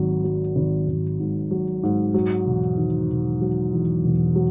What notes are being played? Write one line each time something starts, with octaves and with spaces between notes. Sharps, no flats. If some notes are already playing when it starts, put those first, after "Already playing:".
Already playing: G#1 F#3
F#3
G#1
G#1
G#2
F#3
G#2
F#3
E1
D#3
E1
F#3
E2
E1
F#3